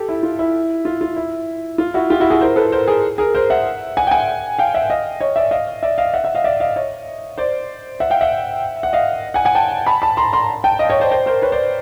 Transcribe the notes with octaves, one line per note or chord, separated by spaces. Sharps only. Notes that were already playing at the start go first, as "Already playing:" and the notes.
Already playing: G4 A4
E4
F4
E4
F4
F4
E4
F4
E4 F#4
F4 G4
E4 F#4
F#4 G#4
A#4 C5
A4 B4
A#4 C5
G#4 A#4
G#4 A#4
A#4 C5
E5 F#5
F#5 G#5
G5
F#5 G#5
F5 G5
E5 F#5
D#5 F5
C#5 D#5
D5 E5
D#5 F5
D5 E5
D#5 F5
E5 F#5
E5 F#5
D#5 F5
D5 E5
D#5 F5
C#5 D#5
C5 D5
E5 F#5
F5 G5
E5 F#5
F#5
D#5 F5
F#5 G#5
F#5 G#5
G5 A5
A5 B5
A5 B5
A#5 C6
A#5 C6
G5 A5
D#5 F5
C#5 D#5
C5 D5
C5 D5
A#4 C5
B4 C#5
C5 D5